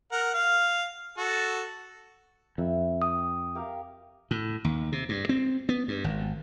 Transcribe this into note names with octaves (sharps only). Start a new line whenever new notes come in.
A#4 F#5
F5
F#4 A4
F2 E5 B5
G5 D#6
G4 A#4 F5
A2
D#2
C3
G2
C4
B3
G2
G#1